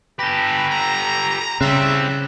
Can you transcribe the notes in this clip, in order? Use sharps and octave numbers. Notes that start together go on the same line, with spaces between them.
G4 A4 B4 B5 A#6
A#5
C#3 G3 C4 E5 F#6 A6 E7